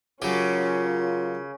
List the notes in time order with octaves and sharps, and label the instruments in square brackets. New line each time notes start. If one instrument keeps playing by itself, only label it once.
[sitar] C#3 [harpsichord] F#3 G4 [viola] C#4 [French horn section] F4 A#4